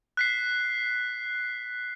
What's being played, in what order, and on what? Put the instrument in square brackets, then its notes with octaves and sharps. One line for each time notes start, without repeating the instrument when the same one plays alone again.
[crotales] F#6 B6 C7